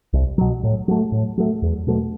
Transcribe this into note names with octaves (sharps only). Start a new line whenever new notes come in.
C2
B2 F#3
A2
F#3 A3
A2
F#3 A3
E2
B2 F#3 A3